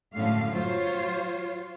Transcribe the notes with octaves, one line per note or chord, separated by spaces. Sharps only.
F#2 A2 D3 A3 F5
F#3 F4 C5 C#5